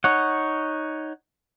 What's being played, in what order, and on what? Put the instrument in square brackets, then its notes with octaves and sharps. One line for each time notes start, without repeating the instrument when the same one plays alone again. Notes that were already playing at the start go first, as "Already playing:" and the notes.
[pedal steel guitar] D#4 C#5 F#5